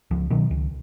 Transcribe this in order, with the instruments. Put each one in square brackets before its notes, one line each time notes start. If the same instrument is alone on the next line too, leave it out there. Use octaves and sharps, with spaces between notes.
[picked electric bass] C#2 F3
B2 D#3 F#3
C#2